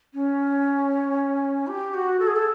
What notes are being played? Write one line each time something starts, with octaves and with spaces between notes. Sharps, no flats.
C#4
G4
F#4
A4
G#4
A4